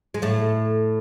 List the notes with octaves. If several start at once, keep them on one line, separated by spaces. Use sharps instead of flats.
G#3
A2 A3